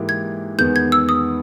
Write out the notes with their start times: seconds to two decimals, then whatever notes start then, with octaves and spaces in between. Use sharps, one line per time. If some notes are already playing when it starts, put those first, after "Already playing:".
Already playing: G#2 E3 A#3 E4 G4
0.09 G#6
0.58 E2 D#3 G#3 B3 G6
0.76 G#6
0.92 E6
1.09 D#6